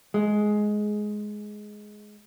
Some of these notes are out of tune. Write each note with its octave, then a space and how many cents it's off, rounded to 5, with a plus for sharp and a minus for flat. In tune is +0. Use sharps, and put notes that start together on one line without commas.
G#3 +10